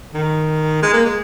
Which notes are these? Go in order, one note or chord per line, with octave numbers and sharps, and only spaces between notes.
D#3
G#3
A#3
G#3